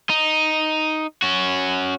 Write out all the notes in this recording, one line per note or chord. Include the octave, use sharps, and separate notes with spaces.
D#4
C#4 F#4